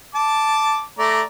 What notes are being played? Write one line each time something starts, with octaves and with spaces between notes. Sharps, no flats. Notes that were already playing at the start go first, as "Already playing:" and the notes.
A5 D6
A3 D5 A#5